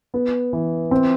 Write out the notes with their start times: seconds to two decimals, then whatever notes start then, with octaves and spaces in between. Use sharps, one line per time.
0.14 B3
0.53 E3
0.91 C4